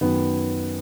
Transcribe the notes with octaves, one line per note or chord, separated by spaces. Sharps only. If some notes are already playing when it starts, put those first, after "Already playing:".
F#2 D#3 B3